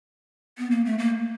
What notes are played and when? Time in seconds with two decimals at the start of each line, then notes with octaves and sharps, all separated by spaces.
0.58 B3
0.71 A#3
0.85 A3
0.98 A#3